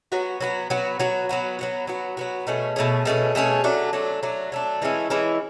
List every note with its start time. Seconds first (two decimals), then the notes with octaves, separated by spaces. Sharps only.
0.12 F#3 B3 F#4
0.41 F#3 B3 F#4
0.70 F#3 B3 F#4
1.00 F#3 B3 F#4
1.29 F#3 B3 F#4
1.59 F#3 B3 F#4
1.87 F#3 B3 F#4
2.17 F#3 B3 F#4
2.47 B2 A3 C#4 G#4
2.76 B2 A3 C#4 G#4
3.05 B2 A3 C#4 G#4
3.35 B2 A3 C#4 G#4
3.64 F#3 A3 D4
3.93 F#3 A3 D4
4.23 F#3 A3 D4
4.52 F#3 A3 D4
4.82 E3 G#3 C#4 E4
5.10 E3 G#3 C#4 E4